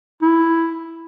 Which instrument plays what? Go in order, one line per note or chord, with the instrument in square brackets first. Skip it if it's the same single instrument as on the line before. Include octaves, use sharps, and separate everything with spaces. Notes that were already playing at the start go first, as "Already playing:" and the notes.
[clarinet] E4